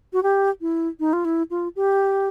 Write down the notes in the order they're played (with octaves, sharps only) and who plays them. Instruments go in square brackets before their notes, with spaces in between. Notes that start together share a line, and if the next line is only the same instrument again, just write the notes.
[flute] F#4
G4
E4
D#4
F4
E4
F4
G4